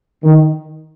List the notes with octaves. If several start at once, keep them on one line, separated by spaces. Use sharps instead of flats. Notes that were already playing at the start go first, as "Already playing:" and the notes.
D#3